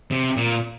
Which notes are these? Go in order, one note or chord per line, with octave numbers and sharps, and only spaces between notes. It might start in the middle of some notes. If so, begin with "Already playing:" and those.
C3
A#2